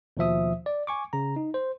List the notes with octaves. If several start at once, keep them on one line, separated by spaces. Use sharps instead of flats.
D#2 B2 F3 E5 D#6
D5
G#5 C#6 D6
C#3 A#5
D#4
C5